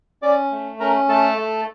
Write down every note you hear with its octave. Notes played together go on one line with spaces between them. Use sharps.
C#4 D5 D6
A3
C#4 A#4 A#5
A3 A4 A5
A3